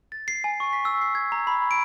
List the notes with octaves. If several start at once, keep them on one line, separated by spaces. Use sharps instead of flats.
A6
C7
G#5
C#6
B6
E6
C7
G#6
A#5
B5
D7